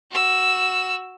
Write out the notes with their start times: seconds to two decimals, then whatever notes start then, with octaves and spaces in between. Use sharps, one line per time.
0.11 F#4 E6